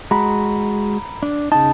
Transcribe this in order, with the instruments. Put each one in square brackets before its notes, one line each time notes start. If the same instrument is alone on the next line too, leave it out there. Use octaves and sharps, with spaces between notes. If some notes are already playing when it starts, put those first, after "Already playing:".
[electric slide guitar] G#3 F#4 [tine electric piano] A#5 B5
[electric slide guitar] D4
[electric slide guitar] C#3 D#4 [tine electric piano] A5